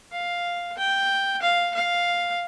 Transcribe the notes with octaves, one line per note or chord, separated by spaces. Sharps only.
F5
G5
F5
F5